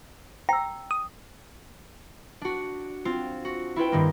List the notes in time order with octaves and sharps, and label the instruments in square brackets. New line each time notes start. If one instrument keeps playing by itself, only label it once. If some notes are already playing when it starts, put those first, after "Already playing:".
[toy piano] G5 E6 [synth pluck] A#5
[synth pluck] D#6
[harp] D4 F#4
C4 F4
F#4
E4 F4 B4 G5
G2 D#3 A#3